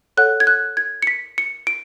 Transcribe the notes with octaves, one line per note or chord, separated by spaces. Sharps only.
A4 C#5 F#5 F#6
G#6
F#6
G#6
C#7
B6
C#7
D7